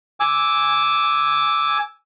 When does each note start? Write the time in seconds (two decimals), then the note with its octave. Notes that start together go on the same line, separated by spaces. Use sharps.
0.20 G#5 D6 E6